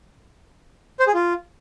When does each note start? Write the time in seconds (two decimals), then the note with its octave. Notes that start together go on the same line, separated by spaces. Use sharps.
1.00 C5
1.07 G#4
1.14 F4